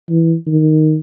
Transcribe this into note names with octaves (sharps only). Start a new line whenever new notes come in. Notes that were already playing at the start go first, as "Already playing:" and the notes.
E3
D#3